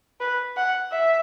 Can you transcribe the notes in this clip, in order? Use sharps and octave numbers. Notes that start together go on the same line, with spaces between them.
B4
F#5
E5